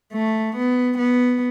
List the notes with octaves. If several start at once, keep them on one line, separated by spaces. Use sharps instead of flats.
A3
B3
B3